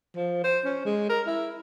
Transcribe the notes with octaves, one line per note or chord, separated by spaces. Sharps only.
F3
C5
C#4
G#3
A#4
E4